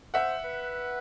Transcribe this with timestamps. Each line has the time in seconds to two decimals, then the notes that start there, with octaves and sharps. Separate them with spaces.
0.14 C5 E5 F#5
0.44 B4